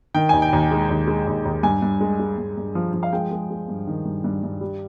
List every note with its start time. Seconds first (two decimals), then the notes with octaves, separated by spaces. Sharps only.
0.15 D#3 G5
0.29 D#2 G#5
0.42 G5
0.53 D#2
0.71 G#3
0.90 D#2
1.08 G#3
1.27 D#2
1.45 D#2
1.63 G2 G#5
1.82 G2
2.01 G#3
2.20 G#3
2.38 G2
2.58 G2
2.75 F3
2.94 F3
3.03 F5
3.13 G#3 G5
3.31 G#3
3.50 G#3
3.68 G2
3.87 D#3
4.05 G2
4.24 G2
4.43 G2
4.61 G3